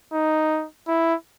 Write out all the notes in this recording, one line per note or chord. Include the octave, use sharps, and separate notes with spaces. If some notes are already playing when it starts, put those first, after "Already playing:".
D#4
E4